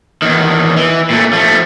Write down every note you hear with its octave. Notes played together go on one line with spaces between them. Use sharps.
E2 D#3
E3
A#2 A3
F3 A3